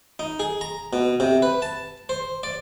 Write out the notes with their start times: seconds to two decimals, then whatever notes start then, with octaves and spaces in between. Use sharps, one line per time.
0.19 D#4
0.40 G#4
0.61 A#5
0.93 B2
1.20 C3
1.42 B4
1.62 A5
2.09 C5
2.43 D5